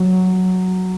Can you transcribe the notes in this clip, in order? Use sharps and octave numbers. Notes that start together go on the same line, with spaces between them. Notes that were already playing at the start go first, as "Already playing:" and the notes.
Already playing: F#3